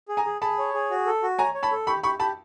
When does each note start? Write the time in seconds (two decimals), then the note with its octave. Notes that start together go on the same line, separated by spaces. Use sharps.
0.09 G#4
0.17 G#5 A#5
0.25 G#4
0.42 G#4 A5 B5
0.58 C#5
0.74 G#4
0.90 F#4
1.06 A4
1.23 F#4
1.39 C#5 G#5 A#5
1.54 C#5
1.63 A5 B5
1.72 A4
1.87 G4 B5 C#6
2.03 G4 B5 C#6
2.19 G4 A5 B5